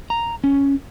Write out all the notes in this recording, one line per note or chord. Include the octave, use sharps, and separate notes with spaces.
A#5
C#4